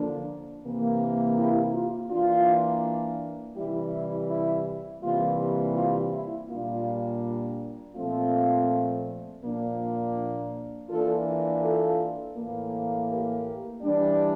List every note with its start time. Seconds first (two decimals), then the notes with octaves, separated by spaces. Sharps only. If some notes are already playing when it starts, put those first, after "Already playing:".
Already playing: D3 F3 A#3 D4
0.63 C3 E3 A#3
1.36 E4 G4
1.73 F4
2.10 E3 A#3 D4 F4
3.56 C3 E3 G3 E4 G4
3.93 E4
4.30 E4
5.03 C3 E3 G3 A#3 F4
5.76 F4
6.13 E4
6.49 A#2 G3 A#3 D4 F4
7.97 A#2 F3 A3 C4 F4
9.44 A#2 F3 A#3 D4
10.89 E3 A#3 D4 F4 A4
11.63 F4 A4
12.36 A2 E3 A#3
13.10 G4 A#4
13.83 E3 G3 D4